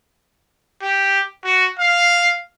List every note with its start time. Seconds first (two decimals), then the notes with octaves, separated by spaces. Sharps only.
0.82 G4
1.44 F#4
1.79 F5